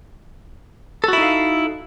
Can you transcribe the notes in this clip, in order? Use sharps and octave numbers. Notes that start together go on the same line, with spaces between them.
D#4 E4 F#4 A4 F5